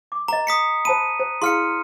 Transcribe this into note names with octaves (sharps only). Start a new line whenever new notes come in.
D6
A#4 D#5 A#5
D#6 B6 C#7
C5 A5 B5 D#7
C5
E4 G#4 F5 C6 F6 C#7